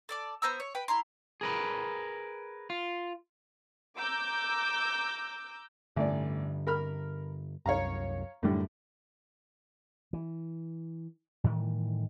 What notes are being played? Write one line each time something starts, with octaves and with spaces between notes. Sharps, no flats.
A4 D5 D6
B3 C5 A#5 E6
C#5
B4 G5 B5
E4 A#5 C6
G#4 A#4 B4
F4
A#5 D6 E6 G6
A1 G2 D3 D5
A#4 B5 F6
C2 F#2 C#5 F5 A#5
F#2 A2 D3 G3
E3
A2 D#3 E3 G3